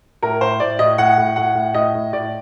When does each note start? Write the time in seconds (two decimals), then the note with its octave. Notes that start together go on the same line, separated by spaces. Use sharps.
0.22 A2 A#4
0.41 A2 C5
0.60 A2 D5
0.79 A2 D#5
0.98 A2 F#5
1.17 A2
1.36 A2 F#5
1.55 A2
1.74 A2 D#5
1.94 A2
2.13 A2 D5